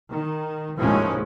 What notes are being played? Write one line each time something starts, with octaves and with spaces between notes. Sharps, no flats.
D#3
F1 D#2 A2 F3 G#3 C#4